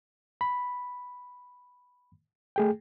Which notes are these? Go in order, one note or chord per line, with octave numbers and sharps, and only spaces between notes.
B5
A3 G#4 G5